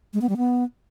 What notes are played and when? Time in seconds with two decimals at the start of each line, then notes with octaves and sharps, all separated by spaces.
0.14 G#3
0.21 B3
0.29 G3
0.37 B3